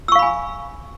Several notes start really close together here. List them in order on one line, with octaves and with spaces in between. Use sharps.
E6 C#6 F5 B5 G#5